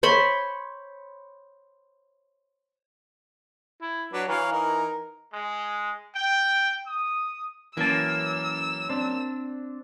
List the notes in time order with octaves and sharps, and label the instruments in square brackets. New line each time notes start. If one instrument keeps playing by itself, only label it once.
[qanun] C5 C#5 B5 C6
[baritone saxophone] E4
[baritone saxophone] F#3 [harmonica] D4 B4
[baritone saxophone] E3 [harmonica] C#5 F5 [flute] A#5
[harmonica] D#4 A#4
[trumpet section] G#3
G5
D#6
[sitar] F#2 A#3 [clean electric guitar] E3 A5 [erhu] E6
[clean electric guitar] C4 D4